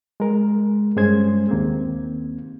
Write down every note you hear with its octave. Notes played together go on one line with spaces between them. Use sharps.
G#3 A#4
G2 G#3 C#4 G#4 C5 G#6
D#2 A#3 C4